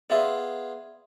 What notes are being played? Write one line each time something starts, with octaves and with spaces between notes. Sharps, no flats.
B3 F4 G#4 D5 E5